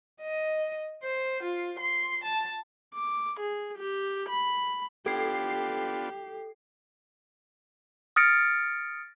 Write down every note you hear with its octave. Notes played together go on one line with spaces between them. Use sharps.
D#5
C5
F4
C6
A5
D6
G#4
G4
B5
B3 D4 F4 G4 A4 C7
D#6 F6 A6 A#6 C#7 D7